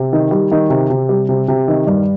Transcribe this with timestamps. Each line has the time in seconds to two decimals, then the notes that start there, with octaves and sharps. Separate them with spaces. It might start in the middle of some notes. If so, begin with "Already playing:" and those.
Already playing: C3
0.13 D#3
0.31 G3
0.51 D#3
0.70 C3
0.90 C3
1.09 G3
1.29 C3
1.48 C3
1.68 D#3
1.87 G2